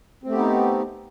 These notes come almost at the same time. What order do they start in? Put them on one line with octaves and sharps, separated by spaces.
C4 A3 G4 B3 D#4